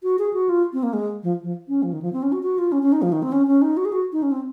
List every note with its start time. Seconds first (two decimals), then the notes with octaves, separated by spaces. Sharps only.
0.03 F#4
0.19 G#4
0.33 F#4
0.49 F4
0.73 C4
0.83 A#3
0.93 G#3
1.23 F3
1.43 F3
1.68 C#4
1.83 F3
1.93 D#3
2.02 F3
2.13 C4
2.23 C#4
2.32 F#4
2.43 F#4
2.58 F4
2.72 C#4
2.82 C#4
2.92 D#4
3.02 F3
3.12 D#3
3.23 C4
3.32 C#4
3.47 C#4
3.62 D#4
3.77 F#4
3.85 G#4
3.92 F#4
4.13 D#4
4.23 C#4
4.32 C4